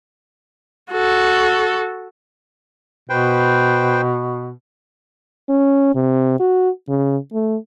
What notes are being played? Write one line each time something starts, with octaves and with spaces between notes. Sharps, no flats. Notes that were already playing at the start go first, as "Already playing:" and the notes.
F#4 A4
B2 B4 C5 G5
C#4
C3
F#4
C#3
A3